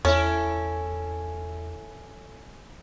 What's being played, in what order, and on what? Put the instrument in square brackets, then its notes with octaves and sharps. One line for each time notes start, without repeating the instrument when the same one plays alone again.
[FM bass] E2 [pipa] C#4 [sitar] E4 A4